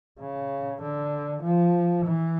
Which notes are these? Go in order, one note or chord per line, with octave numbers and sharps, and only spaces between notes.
C#3
D3
F3
E3